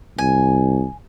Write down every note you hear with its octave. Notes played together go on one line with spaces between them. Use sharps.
C2 G#5